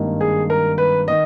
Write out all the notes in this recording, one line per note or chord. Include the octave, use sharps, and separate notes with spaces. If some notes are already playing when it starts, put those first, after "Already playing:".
Already playing: G#1 G2 D#3 G3 A#3
G#4
A#4
B4
D#3 D#5